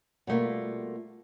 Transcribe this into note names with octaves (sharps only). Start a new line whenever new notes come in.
B2 G3 A3 A#3 F4